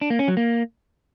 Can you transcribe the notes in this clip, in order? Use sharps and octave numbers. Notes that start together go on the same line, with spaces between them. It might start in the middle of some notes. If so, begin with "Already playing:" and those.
D4
A#3
C#4
F#3
A#3